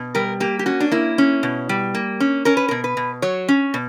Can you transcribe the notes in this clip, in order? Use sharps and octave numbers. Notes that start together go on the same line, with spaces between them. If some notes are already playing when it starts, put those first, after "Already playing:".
Already playing: B2
G3 A#4
A#3 G4
G4
C#4 F#4
D4
A#3 E4
C#4
B2
G3
A#3
C#4
C#4 A#4
B4
B2 A#4
B4
B2
F#3 C#5
C#4
B2